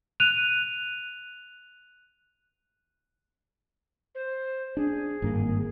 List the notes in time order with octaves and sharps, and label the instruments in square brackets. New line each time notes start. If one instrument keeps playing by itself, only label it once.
[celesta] F#6 D#7 F7
[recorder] C5
[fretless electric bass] D4 [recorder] G#4
[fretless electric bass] G#1 G2 A#3